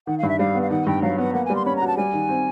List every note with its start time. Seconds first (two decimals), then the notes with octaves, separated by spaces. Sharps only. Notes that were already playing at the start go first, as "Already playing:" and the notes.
0.07 D#3 F#5
0.18 G2 F5
0.29 E5
0.39 G3 F5
0.55 B3
0.62 F5
0.70 D#3 F#5
0.87 G2 G5
1.02 F#3 F5
1.18 B3 F#5
1.34 A#3 F#5
1.45 G3 G#5
1.56 C6
1.65 C#4 B5
1.76 A#5
1.81 F#4
1.87 A5
1.97 G3 G#5
2.13 D#3
2.29 C4